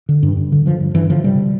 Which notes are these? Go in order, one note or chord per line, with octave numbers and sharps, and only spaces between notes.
D3
G2
G2
D3
D3 F3
G2
G2 E3
D3 F3
C3 G3